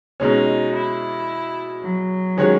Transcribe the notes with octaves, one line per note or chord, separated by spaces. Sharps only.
B2 G#3 C#4 D#4
E4
F#3
D#3 G#3 C#4 F#4 C#5